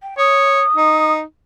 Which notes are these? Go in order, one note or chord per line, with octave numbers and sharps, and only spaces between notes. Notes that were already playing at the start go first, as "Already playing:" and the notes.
G5
C#5 D#6
D#4